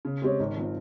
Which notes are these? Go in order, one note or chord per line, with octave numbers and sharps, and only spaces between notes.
C#3
G#3 C4 G4 C#5
G#1
F3 C4